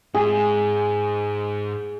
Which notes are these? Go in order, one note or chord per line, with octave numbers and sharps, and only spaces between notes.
G#2 G#4